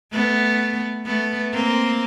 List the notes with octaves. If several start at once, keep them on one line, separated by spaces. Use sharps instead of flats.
A3 B3
A3 B3
A#3 C4